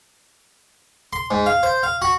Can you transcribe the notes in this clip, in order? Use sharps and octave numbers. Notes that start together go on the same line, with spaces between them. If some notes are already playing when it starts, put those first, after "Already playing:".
C6
G#2
F5
C5
F5
F#4